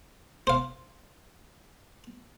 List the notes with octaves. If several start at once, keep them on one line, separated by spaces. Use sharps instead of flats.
C5 F5